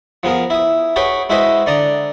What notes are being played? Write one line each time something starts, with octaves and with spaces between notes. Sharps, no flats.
F3 B3 G#4 A#4
E4 D#6
F#4 G#4 B4 C#5 G5
G#3 E4 F#4 B4 C5 D#5
D3 D5 A#5 D#6